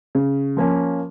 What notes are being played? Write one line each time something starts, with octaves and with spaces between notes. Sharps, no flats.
C#3
F3 A#3 C#4